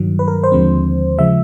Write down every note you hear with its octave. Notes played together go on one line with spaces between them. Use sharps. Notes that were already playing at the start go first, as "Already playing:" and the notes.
Already playing: G2 D#3 F#3
B4
A#4
C5
D#2 D3 F3 G#3 C4
C#3 F3 G#3 E5